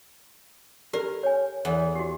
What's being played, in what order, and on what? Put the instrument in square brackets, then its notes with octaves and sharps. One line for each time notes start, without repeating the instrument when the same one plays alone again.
[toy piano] G4 D5 [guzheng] A#4
[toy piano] C#5 G#5
[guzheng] E2
[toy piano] F#4 G4